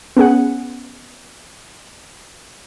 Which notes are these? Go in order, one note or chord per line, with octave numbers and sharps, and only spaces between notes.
B3 C#4 G#4 F#5